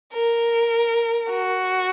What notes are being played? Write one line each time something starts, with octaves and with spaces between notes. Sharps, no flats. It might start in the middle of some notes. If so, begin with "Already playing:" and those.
A#4
F#4